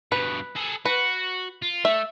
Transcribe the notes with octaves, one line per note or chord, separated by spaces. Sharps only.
G2 B2 B4
G#4 A4
F#4 B4
F4
A3 E5